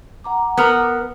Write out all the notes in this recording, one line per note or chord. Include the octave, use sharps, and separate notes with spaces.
F#5 A#5 D6
B3 A#4